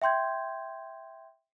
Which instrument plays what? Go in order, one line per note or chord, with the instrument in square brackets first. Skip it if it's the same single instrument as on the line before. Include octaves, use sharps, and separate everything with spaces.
[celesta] E5 G5 C6 G6 G#6